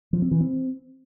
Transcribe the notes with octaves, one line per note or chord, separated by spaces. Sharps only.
F3
C4
E3
C4